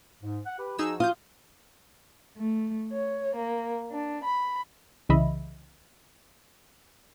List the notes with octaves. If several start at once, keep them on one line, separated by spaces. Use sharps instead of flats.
G#2
F#5
G4 B4
F3 D#4 F#4 G#4 E6
F4 D#6 G6
A3
C#5
A#3
D4
B5
C2 C#3 E3 D#5 E5 B5